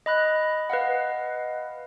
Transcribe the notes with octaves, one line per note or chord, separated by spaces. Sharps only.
D#5 B5 F#6
B4 D#5 F5 F#5